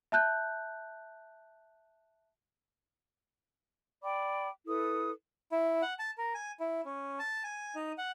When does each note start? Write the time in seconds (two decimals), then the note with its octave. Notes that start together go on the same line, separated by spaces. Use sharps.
0.12 E5 A5 F#6 G6
4.03 D5 G5 B5 D6
4.67 E4 A4 B4 D#6
5.52 E4
5.82 F#5
5.99 A5
6.18 A#4
6.34 G#5
6.60 E4
6.85 C#4
7.19 A5
7.44 G#5
7.75 D#4
7.98 F#5